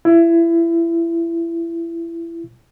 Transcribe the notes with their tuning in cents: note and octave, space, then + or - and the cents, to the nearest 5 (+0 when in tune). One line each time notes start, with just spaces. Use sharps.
E4 +25